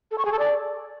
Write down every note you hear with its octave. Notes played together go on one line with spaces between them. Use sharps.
A4
C#6
G#4
A4
D5